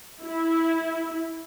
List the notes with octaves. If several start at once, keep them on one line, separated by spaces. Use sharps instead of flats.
E4